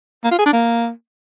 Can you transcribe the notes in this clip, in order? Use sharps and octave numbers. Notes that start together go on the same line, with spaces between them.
A#3
F4
G#4
D4
A#3